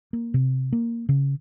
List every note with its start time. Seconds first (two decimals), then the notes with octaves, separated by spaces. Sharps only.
0.13 A#3
0.34 C3
0.72 A#3
1.09 C#3